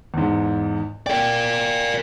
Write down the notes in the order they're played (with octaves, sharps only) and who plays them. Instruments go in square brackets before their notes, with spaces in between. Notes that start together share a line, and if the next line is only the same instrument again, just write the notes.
[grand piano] E2 G#2
[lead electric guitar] A#4 D5 [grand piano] G5